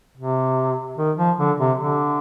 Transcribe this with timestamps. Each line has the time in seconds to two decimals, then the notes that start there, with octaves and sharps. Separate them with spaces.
0.18 C3
0.97 D#3
1.17 F3
1.38 D3
1.59 C3
1.78 D3